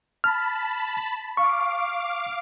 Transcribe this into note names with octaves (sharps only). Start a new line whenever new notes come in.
A5 B5 F6
F5 C#6 D6